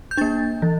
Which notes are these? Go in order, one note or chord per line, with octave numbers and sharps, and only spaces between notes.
G6
A#3 D4 A6
E3